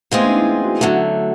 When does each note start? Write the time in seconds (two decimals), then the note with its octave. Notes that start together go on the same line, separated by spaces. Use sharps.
0.11 E3 G#3 A3 B3 C4 F4 G#4
0.23 C#4 D#4
0.35 D4 E4
0.64 E4 F#4
0.81 D3 F#3 A3